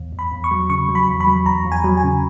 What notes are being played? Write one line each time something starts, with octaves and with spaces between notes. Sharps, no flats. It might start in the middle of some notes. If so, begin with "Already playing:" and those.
Already playing: E2
E2
B5
E2
C#6
F#3
C#3 C#6
F#3
B5
E2
B5
F#3
E2 A#5
E2
G#5
F#3
G#5
C#3